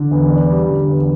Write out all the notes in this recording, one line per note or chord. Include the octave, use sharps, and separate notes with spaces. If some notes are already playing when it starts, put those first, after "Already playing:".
Already playing: D3
E2
D4
G3
D3
E2